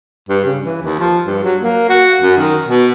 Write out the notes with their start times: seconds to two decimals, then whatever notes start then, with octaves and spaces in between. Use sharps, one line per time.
0.29 G2
0.45 C#3
0.64 E3
0.82 D#2
0.99 F3
1.26 G2
1.43 F#3
1.61 A#3
1.89 F#4
2.21 F#2
2.38 D#3
2.66 B2